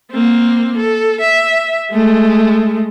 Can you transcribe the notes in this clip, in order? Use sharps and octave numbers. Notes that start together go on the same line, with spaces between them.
A#3 C4
A4
E5
G#3 A3